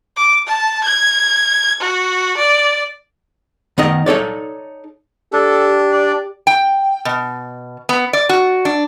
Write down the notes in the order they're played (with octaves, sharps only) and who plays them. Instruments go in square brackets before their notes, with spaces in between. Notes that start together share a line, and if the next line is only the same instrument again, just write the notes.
[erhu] D6
A5
G#6
F#4
D5
[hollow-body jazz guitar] D#3 B3 D#4 D#5
D#4 A4 C#5 D5
[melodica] D4 [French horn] G4 [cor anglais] A4
[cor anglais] D5
[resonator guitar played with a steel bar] G5
B2
B3
D5
F#4
D4